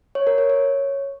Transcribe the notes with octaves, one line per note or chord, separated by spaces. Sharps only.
C#5
A#4
C#5
C#5